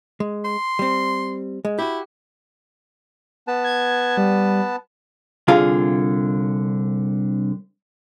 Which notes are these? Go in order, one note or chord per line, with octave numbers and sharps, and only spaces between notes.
G#3
C6
G3 C4
G#3
E4 F#4 G4
B3 B4 A5
G#6
G3
C2 D3 F4 G#4 F5